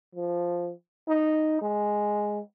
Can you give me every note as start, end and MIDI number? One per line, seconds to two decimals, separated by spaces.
0.15 0.71 53
1.08 1.59 63
1.62 2.40 56